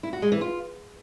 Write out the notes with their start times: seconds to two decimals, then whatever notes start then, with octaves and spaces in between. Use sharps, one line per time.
0.03 E4
0.13 F#4
0.22 G#3
0.32 E3
0.41 F4